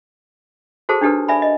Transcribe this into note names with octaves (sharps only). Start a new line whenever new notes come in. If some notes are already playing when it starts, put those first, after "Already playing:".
F#4 G#4 A4 C5 A5
D4 D#4 G4 A4 B4
D5 E5 G#5 B5
D#5